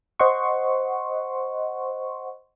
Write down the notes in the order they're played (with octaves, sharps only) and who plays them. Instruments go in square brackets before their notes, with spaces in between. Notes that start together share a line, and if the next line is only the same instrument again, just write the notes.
[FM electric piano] C5 D#5 F#5 C6 C#6